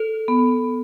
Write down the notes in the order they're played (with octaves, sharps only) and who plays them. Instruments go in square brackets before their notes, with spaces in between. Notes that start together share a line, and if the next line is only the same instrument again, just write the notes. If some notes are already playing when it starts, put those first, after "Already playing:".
Already playing: [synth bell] A4
[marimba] B3